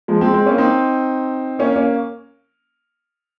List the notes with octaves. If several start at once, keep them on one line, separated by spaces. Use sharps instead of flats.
F3 G#3
G#3 C4
G#3 C4
A#3 C#4
C4 D#4
A#3 C#4
A#3 C#4